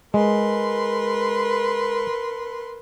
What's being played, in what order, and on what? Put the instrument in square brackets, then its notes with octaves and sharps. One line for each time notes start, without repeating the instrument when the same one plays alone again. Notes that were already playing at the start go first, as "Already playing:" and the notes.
[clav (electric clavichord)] G#3 [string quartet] A#4 B4 C6